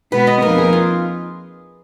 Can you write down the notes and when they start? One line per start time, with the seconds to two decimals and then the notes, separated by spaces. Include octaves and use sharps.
0.12 B2 G#3 B3 B4
0.27 D#5
0.42 F2 F3 A#3 D#4 A#4 B4
0.58 G#4
0.73 F4